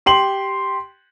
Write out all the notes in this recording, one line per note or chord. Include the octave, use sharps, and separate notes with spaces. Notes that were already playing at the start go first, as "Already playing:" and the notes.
G4 C6 F#7